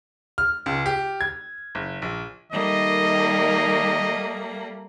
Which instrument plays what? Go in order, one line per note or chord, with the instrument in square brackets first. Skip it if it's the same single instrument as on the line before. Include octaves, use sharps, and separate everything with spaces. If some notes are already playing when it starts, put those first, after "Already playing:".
[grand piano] F6
C#2
G4
G#6
F#1
A#1
[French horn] D#3 [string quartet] G3 A3 A#3 [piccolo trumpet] D#5